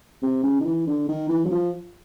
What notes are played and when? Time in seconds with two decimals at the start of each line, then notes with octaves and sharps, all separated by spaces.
0.22 C3
0.43 C#3
0.60 D#3
0.65 E3
0.87 D3
1.08 D#3
1.29 E3
1.45 F#3
1.51 F3